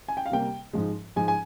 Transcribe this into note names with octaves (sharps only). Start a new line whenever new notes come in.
G#5
G5
F5
C3 G3 A#3 G5
G#2 F3 G#3
G#2 F3 G#3 G#5
G#5